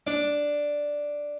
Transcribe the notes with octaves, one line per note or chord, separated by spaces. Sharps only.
D4